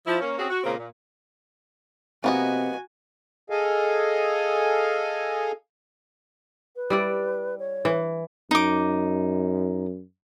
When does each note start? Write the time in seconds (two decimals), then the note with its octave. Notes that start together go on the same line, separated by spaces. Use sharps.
0.07 F3 E4
0.20 A#3 C#4
0.39 C4 C#4 F#4 G#4
0.50 F#4
0.64 A#2 C#3 G#3 A#3 C4
0.77 A#2
2.24 C3 A#3 B3 F#4 D#5 G#5
3.50 G#4 A4 D#5 F5 G#5
6.76 B4
6.90 G3 E4 D5
7.59 C#5
7.85 E3
8.51 F#2 D#4 D6